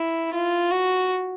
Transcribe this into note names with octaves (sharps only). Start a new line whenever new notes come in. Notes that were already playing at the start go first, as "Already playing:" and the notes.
Already playing: E4
F4
F#4